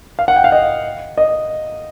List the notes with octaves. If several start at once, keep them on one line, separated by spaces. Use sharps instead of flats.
F5
F#5
G5
F5
D#5
D#5